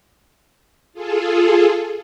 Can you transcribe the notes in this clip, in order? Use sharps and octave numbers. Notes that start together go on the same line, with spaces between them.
F4 G#4 A4